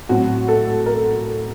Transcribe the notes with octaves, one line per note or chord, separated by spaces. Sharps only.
A2 F#3 C4 F#4
A4
A#4